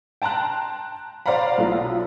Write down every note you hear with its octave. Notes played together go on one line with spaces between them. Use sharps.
G5 A5 A#5 C6 F#6
C5 D5 F5 F#5 A#5 B5
B1 A3 F4